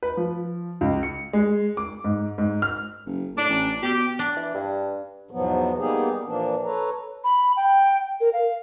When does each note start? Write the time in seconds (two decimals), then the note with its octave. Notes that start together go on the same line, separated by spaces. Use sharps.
0.03 B4
0.17 F3
0.81 C#2
1.03 C#7
1.33 G#3
1.77 D6
2.04 G#2
2.38 G#2
2.62 F6
3.06 F#1
3.36 A2 D4
3.49 A1
3.82 B2 G4
4.19 D4
4.37 E3
4.54 G2
5.31 E2 G#2 B2 F3 F#3 B3
5.78 G3 A#3 B3 D#4 G4 G#4
6.25 A#2 E3 F3 A#3 D4
6.65 A4 B4 C#5 A#5
7.24 B5
7.57 G5
8.21 A#4
8.33 F5